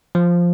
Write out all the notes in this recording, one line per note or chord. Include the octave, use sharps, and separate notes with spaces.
F3